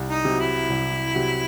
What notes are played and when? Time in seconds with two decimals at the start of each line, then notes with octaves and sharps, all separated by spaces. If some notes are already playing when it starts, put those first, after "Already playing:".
Already playing: C2
0.09 D#4
0.25 C3 F#3
0.39 E4
0.70 C2
1.14 C3 F#3